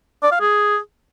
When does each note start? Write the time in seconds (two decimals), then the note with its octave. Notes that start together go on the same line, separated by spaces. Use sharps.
0.23 D5
0.32 F5
0.40 G#4